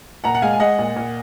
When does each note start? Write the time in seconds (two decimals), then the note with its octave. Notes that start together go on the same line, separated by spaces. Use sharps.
0.24 A#2 F#5 A#5
0.35 F#5
0.42 G#3 F5 G#5
0.53 G#5
0.59 G#3 D#5 F#5
0.79 A#2
0.96 A#2